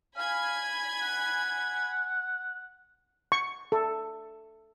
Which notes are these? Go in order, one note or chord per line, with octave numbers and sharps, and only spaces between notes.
F5 G#5 B5 G#6
F#5
C#6
A4